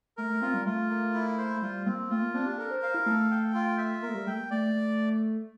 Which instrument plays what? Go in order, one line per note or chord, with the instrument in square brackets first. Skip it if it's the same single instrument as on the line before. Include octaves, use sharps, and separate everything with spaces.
[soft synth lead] A3 [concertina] A#4
[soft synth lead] A3
[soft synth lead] C4 [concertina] F4
[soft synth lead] G3
[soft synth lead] A3 [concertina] F4
[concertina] A#3
E4
C5
[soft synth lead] A3
[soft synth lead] G3 [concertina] F4
[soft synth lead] A#3 [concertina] C4
[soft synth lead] A3 [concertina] F4
[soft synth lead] A#3
[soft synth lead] C4 [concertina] D4
[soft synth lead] G4
[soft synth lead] A4 [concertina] A#4
[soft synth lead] C5
[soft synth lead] C5 [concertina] F5
[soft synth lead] E4
[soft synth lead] A3 [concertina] A4
[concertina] G5
F4
E5
[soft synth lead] A#3 [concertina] A#4
[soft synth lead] A3
G3
[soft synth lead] A3 [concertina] G5
[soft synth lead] A#3
[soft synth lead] A3 [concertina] D5